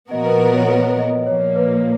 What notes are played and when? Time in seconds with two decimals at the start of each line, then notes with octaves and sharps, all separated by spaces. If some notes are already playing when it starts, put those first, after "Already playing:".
0.11 A#2 F3 B3 F#4 A#4 D#5
0.25 B4
0.40 B4
0.54 C#5
0.68 B4
0.98 D#5
1.27 A#2 F3 A#3 C#5
1.56 B4